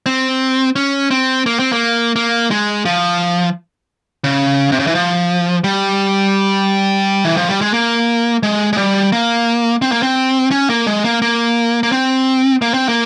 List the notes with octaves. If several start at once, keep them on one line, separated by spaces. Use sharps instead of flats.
C4
C#4
C4
A#3
C4
A#3
A#3
G#3
F3
C#3
C3
C#3
E3
F3
G3
E3
F3
G3
G#3
A#3
G#3
G#3
G3
A#3
C4
A#3
C4
C#4
A#3
G#3
A#3
A#3
A#3
C4
A#3
C4
A#3